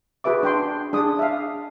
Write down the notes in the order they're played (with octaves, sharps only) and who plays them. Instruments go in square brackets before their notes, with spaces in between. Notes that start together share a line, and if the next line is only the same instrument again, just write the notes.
[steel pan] F#4 G#4 B4 E5 D6
D4 G5 C6
D4 G#4 D#6
E5 F5